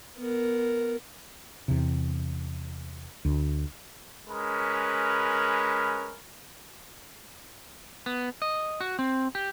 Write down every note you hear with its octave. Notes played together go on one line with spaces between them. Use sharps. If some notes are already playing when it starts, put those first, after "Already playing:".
B3 A#4
E2 C3
D2
G#3 C#4 A#4 B4 B5
B3
D#5
F#4
C4
G4